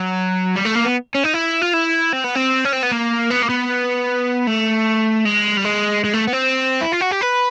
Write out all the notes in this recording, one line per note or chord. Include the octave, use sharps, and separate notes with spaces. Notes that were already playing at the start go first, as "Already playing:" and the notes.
Already playing: F#3
G3
A3
A#3
B3
C#4
D#4
E4
F4
E4
C4
B3
C4
C#4
C4
B3
A#3
B3
A#3
B3
A3
G#3
G3
G#3
G#3
A3
B3
C4
E4
F4
F#4
G4
B4